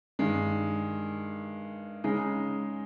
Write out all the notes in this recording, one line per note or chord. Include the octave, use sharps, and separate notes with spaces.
G2 D#3 G#3
C#3 G#3 D#4 G#4